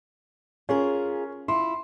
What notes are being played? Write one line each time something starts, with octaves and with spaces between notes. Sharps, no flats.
C#4 F4 G#4 A#4
E4 F4 C6